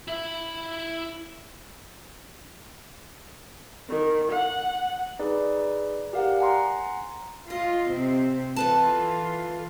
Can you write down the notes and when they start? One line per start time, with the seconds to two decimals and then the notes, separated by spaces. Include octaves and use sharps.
0.08 E4 E5
3.89 D#3
4.31 F#5
5.20 D#4 G#4 B4 D5
6.13 G4 A#4 D5 F5 F#5
6.39 F#5 G#5 A#5 C6
7.50 F4 D#5
7.89 C3 C4
8.56 E3 F4 A4 B4 A5